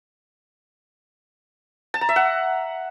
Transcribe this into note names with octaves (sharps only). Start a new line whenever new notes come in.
A5
A#5
E5
F#5